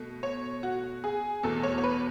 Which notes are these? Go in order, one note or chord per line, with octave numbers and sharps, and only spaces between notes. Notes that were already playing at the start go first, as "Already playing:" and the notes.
Already playing: B2 A3
C#5
F#4
G#4
E2 B2 A3 A4
C#5
C#5
B4